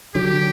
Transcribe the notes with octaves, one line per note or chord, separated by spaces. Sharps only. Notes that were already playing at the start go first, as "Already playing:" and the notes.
D3 F#3 G4